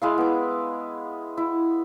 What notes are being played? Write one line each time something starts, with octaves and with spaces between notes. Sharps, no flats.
G#3 E4 F5
B3 D6
E4